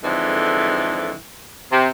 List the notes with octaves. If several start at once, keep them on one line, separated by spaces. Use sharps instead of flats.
F2 G#2 D3 E3
C3